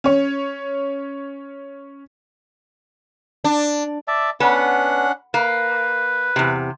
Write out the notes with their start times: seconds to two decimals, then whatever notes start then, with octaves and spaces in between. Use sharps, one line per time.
0.04 C#4 C#5
3.44 D4
4.08 D5 E5 A5
4.40 B3 C#4 D4 F#5
5.34 A#3 B4
6.36 E2 C3